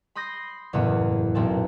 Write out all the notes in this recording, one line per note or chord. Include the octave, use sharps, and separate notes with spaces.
B5 C6 D#6 G6 A#6 C7
F#1 E2 A2 C#3 B3 E6
B1 A#2 C4 A4